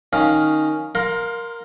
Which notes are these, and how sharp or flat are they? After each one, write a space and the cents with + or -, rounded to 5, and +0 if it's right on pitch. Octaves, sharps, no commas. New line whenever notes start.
D#3 +0 C#4 +0 F5 +0
A#4 +0 F5 +25 C6 -10